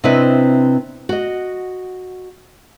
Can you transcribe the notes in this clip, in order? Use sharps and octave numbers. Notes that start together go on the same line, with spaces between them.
C3 C4 D4 E4 B4 D#5
F#4 D#5